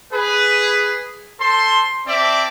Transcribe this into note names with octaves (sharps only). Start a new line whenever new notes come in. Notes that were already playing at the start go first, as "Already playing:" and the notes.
G#4 B4
A4 C5 C6
C4 D5 E5 A5 D6